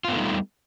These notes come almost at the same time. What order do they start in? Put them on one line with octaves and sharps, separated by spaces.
F4 B3 A3 D#4 G3